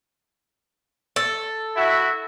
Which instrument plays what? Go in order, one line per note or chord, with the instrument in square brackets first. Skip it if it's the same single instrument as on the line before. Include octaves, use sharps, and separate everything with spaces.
[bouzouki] A4
[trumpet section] E4 F#4 E5